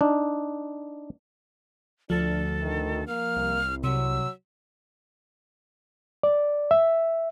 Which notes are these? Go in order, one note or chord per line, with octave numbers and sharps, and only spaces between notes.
D4 D#4
D2 F3 D4 A4
D#3
A#3 F6
C2
C3 F#3 E6
D5
E5